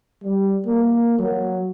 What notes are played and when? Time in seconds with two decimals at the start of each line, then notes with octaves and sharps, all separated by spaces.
0.23 G3
0.66 A#3
1.18 F#3